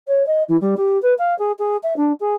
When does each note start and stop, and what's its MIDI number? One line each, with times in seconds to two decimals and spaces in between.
0.07 0.23 73
0.26 0.42 75
0.48 0.56 52
0.61 0.74 55
0.76 1.00 67
1.02 1.13 71
1.18 1.36 77
1.38 1.51 68
1.58 1.76 68
1.83 1.93 76
1.96 2.12 62
2.19 2.34 68